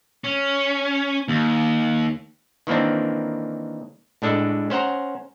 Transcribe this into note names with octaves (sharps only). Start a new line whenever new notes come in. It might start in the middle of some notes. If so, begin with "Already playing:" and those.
C#4
D#2
D#3 E3 A#3 C4 D4
A2 G#3 D4 A4
C#4 C5 F#5 A#5